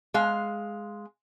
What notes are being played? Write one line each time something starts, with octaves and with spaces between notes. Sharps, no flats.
G#3 F5